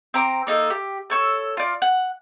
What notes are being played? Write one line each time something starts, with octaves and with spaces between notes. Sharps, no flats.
C4 A#5 D6
A#3 D#4 A4
G4
A4 C#5 E6
F4 D5
F#5